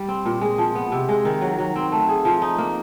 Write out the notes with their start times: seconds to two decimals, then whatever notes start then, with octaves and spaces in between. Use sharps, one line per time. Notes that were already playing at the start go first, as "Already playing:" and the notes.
Already playing: G3
0.08 C4
0.25 A#2
0.41 G#3
0.58 F3
0.75 B3
0.92 C3
1.09 G#3
1.25 D#3
1.41 F#3
1.59 F#3
1.76 C4
1.92 A3
2.09 G#4
2.25 F3
2.42 D#4
2.58 A#3